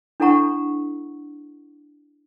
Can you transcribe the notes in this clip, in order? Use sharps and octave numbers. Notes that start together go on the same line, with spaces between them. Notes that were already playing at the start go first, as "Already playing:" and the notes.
D4 E4 A4 F#5 A#5 C#6